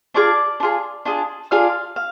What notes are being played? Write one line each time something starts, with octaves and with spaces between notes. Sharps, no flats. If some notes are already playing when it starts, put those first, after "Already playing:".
D4 F4 G#4 D5 D6
D4
F4 G#4
D4 F4 G#4
D4 F4 G#4 F5 F6
F5